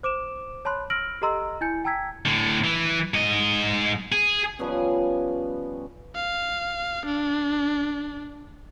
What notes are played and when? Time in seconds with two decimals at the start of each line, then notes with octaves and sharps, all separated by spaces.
0.03 C5 D6 D7 E7
0.65 C#5 A5 B5 C6 F#6
0.90 E6 F6 A#6 D7 F#7
1.22 G4 A4 D#5 A#5 C6 E6
1.61 E4 G#5 G6 C#7
1.84 G5 A5 A#5 E6 G#6 B6
2.25 A2 D3
2.64 E3
3.14 G#2 D#5
4.12 G#4
4.59 F3 G3 B3 C#4
6.15 F5
7.06 D4